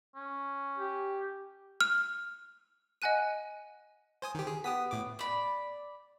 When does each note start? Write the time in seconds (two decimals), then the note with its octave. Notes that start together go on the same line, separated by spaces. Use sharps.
0.16 C#4
0.78 G4
1.81 F6
3.02 D#5 F#5 G#5 F#6 D#7
4.22 C5 G#5 D#6
4.35 D#3 G4
4.47 G#4
4.64 B3 G4 D#6 B6
4.91 A2 D6
5.19 D5 B5